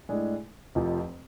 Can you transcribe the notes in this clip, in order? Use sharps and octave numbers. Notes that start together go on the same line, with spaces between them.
A2 G#3 D4 G#4
F1 F2 F3